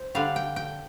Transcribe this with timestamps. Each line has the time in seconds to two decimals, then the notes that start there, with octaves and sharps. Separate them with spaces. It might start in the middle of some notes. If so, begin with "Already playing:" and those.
Already playing: C5
0.15 D3 G3 F5
0.36 G5
0.56 G5